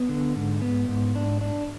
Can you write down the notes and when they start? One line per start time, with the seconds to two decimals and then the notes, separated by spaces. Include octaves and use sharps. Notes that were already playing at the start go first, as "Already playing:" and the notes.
Already playing: B3
0.09 D3
0.36 G#2
0.62 B3
0.88 G#2
1.15 D4
1.41 D4